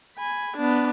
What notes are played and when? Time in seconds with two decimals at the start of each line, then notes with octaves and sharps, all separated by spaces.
0.17 G#5 B5
0.58 B3 D4